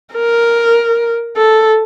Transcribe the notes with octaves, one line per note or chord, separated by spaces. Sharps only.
A#4
A4